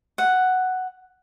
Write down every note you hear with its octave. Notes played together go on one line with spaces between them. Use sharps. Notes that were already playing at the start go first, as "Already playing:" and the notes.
F#5